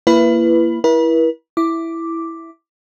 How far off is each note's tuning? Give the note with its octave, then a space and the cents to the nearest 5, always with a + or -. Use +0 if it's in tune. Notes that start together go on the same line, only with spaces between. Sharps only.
A#3 +0 E4 +30 B4 +0
E4 +0 B4 -45
E4 +0 D6 +0